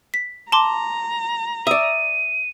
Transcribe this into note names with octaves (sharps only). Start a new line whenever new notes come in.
B6
A5 A#5 C6 D6
D5 E5 D#6 D#7